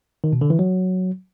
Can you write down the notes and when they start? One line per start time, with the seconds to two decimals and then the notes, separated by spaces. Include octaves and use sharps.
0.24 D#3
0.33 B2
0.41 D3
0.50 E3
0.59 F#3